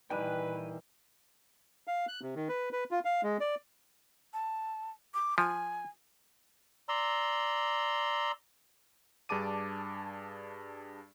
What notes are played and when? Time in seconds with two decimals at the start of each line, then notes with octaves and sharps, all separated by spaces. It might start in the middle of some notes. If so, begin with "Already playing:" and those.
0.10 A#2 D#3 E3 G3 B4 G5 G#5 F#6
1.87 F5
2.08 F#6
2.22 C3
2.36 D#3
2.49 B4
2.72 B4
2.91 F4
3.05 F5
3.23 G#3
3.41 D5
4.33 A5
5.14 D6
5.38 F3 G#5
6.89 D5 A#5 C6 E6
9.29 G2 D4 G#4 A5 D6 D#7